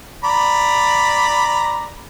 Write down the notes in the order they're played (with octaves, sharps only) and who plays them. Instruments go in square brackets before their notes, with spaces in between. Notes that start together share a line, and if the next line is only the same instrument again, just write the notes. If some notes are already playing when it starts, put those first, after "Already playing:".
[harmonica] D5 A#5 B5